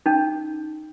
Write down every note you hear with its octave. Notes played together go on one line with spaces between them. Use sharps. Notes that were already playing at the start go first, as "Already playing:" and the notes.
C#4 D#4